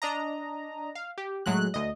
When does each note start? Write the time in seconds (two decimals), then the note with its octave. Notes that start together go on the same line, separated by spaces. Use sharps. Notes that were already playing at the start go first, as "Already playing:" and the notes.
0.02 D4 D#5 A#5
0.95 F5
1.18 G4
1.46 A2 F#3 G#3 F#6
1.74 D2 D#5